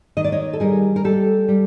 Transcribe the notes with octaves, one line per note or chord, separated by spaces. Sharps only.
D#3 D#5
D5
C#5 D#5
A4
G3 G#4 A#4
A#4
G3 G4 A4
G3